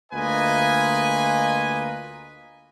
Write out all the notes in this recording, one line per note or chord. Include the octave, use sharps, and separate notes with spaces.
D2 A#3 F4 B4 D#5 G#5